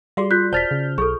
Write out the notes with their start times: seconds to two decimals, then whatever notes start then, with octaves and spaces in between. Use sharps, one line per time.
0.17 G3 F#4 G#4 D5 F5 C6
0.31 F4 F#6 G6 B6
0.53 E1 C5 D5 A5 F6 G6 A6 B6
0.71 C#3
0.98 B1 G#4 A4 C#6